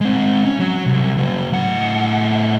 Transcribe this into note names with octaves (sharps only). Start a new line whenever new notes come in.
G#3 C4
C#4
F#3
C2
C#3 F#3
A2 F#5